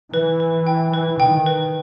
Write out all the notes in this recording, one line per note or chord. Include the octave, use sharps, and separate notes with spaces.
E3 B4
B4
G5
B4
D#3 G5
B4